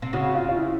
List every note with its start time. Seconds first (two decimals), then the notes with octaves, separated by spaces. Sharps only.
0.02 C3
0.13 C#3 F#4
0.35 F4
0.49 F4
0.56 E4